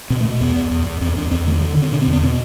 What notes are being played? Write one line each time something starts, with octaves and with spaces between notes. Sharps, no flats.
B2 C4
A3
B2
E2 B3
E2
E2
E2
E2 C4
E2 D4
E2 C4
D3 A3
D3
D3
C4
B2 D4
C4
E2
B3
B2 C4